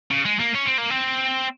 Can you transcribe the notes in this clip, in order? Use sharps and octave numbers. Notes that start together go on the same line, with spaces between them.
C#3
G#3
A#3
C#4
C4
A#3
C4